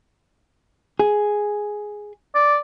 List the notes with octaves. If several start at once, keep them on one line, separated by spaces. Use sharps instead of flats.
G#4
D5